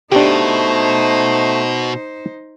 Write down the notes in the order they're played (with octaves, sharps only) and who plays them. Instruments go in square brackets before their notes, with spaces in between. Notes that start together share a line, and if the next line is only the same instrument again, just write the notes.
[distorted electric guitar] B2 [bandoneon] A3 [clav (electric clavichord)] D4 G4 [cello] D#4 C5